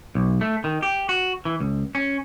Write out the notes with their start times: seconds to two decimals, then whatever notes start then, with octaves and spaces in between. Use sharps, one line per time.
0.15 B1
0.41 A3
0.64 D#3
0.83 G4
1.09 F#4
1.45 E3
1.60 C#2
1.95 C#4